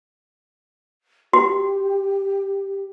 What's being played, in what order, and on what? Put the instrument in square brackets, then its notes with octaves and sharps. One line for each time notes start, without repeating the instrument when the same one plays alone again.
[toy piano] F#4 [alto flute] G4